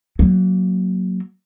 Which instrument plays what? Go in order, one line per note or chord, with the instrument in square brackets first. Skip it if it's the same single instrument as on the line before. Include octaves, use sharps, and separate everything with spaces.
[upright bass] F#3 A#3